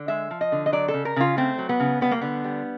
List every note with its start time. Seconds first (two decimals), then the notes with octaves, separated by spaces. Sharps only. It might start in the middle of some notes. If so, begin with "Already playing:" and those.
Already playing: D3
0.08 G#3 E5
0.31 F3
0.41 D#5
0.52 D3
0.66 D#5
0.72 F#3 D5
0.88 A4
0.94 C#3
1.05 A#4
1.16 C#3 F4
1.37 A3 C4
1.58 F#3
1.69 B3
1.80 C#3
2.01 G3 B3
2.11 A#3
2.21 D3 B3
2.44 G3